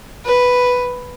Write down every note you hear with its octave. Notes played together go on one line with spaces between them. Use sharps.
B4